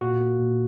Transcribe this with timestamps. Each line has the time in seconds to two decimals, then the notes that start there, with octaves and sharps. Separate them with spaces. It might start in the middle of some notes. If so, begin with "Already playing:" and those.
0.01 A#2 F#4
0.20 A#3
0.39 A#2